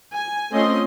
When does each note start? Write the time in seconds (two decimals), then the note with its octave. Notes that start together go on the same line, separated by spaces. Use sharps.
0.13 G#5
0.51 A3 C4 C#4 F4 D#5 C6